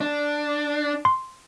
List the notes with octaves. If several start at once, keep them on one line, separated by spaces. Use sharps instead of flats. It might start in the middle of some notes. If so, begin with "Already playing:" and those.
D4
C6